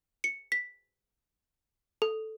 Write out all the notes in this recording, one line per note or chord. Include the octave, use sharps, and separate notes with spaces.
C#7
B6
A4